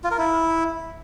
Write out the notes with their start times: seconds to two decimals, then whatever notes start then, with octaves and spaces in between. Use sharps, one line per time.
0.04 F4
0.11 A#4
0.18 E4